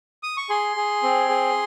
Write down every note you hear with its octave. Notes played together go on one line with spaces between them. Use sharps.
D#6
C#6
G#4 C6
G#4
C4
G#4